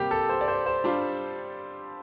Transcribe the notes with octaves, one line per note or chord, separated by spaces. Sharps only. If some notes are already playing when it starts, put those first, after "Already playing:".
Already playing: C3 G3 A#3 G4
A4
C5
D5
C5
C5
G3 D4 F4